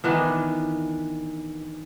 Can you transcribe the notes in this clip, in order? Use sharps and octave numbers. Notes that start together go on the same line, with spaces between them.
D#3 E3 B3 D4